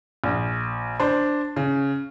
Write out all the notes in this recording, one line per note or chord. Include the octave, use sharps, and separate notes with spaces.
A#1
D4 C5
C#3